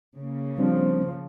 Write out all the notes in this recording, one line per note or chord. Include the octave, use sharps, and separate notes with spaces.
C#3 A#3
F3 G3 C4 D4